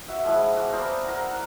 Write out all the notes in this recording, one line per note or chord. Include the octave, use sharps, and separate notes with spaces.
F#4 E5
F3 G#3 E4
F#4 D6
B3 A#4 C5 D5
A#4 C5 A#5
F#5